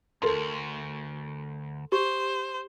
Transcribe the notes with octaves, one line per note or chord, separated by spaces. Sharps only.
D2 G2 A4 A#4 C6
G4 C5